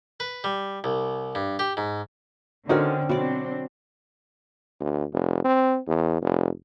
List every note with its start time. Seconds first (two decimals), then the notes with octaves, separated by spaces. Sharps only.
0.20 B4
0.44 G3
0.84 C2
1.35 G2
1.59 G4
1.77 G#2
2.69 D3 C4 C#4 D#4 F#4 A#4 D5
3.09 B2 F#3 C4 D4 D5
4.81 D2
5.12 F1
5.45 C4
5.87 E2
6.22 F1